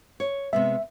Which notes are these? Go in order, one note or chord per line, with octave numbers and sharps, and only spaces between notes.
C#5
C3 G#3 B3 E5